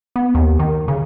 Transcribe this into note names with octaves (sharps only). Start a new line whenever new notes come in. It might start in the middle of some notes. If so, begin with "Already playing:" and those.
B3
D#2
D#3
C#3